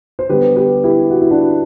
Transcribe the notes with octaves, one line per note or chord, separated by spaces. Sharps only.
C5
D3 G3 B3 G4 B4
G4 B4
E4 G4
F#4
E4
D4 F#4